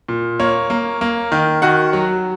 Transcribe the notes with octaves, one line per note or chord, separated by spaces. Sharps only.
A#2
A#3 C#5
A#3
A#3
D#3
D#3 F#4 F#5
F#3